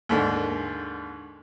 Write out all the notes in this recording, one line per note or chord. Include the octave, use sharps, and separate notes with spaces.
D#2 G#2 D3